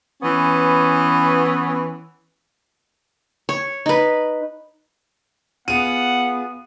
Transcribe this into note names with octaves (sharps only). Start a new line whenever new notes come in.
E3 B3 C#4
C#5
D#4 B4
B3 F4 G#4 F#5 D#7